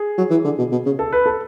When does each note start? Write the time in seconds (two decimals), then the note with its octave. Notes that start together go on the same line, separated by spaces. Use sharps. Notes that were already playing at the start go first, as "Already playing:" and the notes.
Already playing: G#4
0.18 F#3
0.30 E3
0.44 D3
0.58 B2
0.72 B2
0.86 C#3
0.99 A4
1.13 B4
1.26 A4